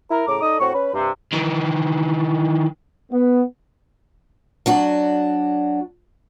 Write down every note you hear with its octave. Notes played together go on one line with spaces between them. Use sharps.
E4 A#4
A2 C#3 A#5 D6
D#4 A4 D5 D#5 D#6
A2 C4 F#4 C#6
C#4 B4
G2 C3
D#3 E3
B3
F#3 D4 F#4